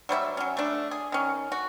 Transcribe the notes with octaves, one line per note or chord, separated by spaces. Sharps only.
F#3 G3 C5 E5
F#3 C#4
A3 D4
G#4
D#3 C#4
F#4